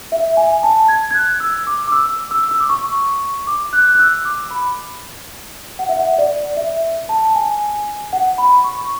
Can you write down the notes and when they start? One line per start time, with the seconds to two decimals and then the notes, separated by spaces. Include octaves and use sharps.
0.12 E5
0.37 G#5
0.63 A5
0.88 G#6
1.11 G#6
1.14 F#6
1.40 E6
1.67 D6
1.88 D6
1.92 E6
2.31 E6
2.51 E6
2.60 D6
2.69 C#6
3.47 D6
3.73 F#6
3.94 F#6
3.99 E6
4.25 D6
4.51 B5
5.79 F#5
5.89 E5
5.99 F#5
6.18 D5
6.57 E5
7.09 A5
7.35 G#5
8.13 F#5
8.38 B5
8.64 C#6